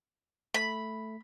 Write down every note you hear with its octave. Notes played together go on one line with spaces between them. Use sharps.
A3 B5